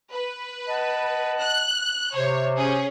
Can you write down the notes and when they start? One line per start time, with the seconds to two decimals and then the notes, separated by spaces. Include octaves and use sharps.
0.13 B4
0.67 D#5 F#5 A5
1.40 F#6
2.15 C3 C5 C#5
2.56 C#4 G#4